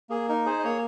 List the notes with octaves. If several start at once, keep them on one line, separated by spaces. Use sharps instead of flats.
A#3 G#4
D#4 A#4
G#4 C5
D#5
A#3 C#5